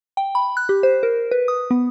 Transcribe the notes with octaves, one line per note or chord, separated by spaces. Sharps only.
G5
B5
F#6
G4
C5
A#4
B4
D#6
B3